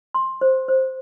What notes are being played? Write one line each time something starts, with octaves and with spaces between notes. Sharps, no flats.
C6
C5
C5